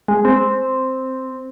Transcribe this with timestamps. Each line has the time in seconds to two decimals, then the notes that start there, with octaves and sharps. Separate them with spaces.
0.08 G#3
0.25 C4